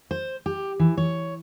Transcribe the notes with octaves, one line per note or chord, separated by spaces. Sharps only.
C5
G4
E3
C#5